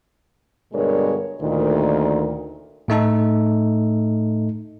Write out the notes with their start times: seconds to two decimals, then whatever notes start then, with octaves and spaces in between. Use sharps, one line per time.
0.73 G2 B2 D3 G#3 A#4 C#5
1.42 D2 A#2 D#3
2.88 A2 A3 D#4 A4